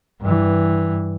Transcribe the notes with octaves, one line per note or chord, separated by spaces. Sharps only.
G2 E3